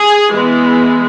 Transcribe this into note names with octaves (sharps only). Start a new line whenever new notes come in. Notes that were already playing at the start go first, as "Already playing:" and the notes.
Already playing: G#4
E3 G#3 B3